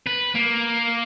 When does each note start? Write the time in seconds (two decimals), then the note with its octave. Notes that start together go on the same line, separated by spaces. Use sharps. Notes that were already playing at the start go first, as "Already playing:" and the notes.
0.07 B4
0.35 A#3